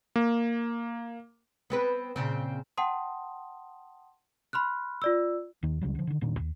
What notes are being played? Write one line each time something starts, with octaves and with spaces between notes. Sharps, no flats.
A#3
B3 C4 B4
A#2 C#3 C4
F#5 G5 A5 C6 D#6
B5 C6 F6 F#6
F4 D5 E6
D#2 D#3
C#2 C#3 F#3 G3
D3 F3
D3 D#3
E1 A#2 D#3 D4
D#2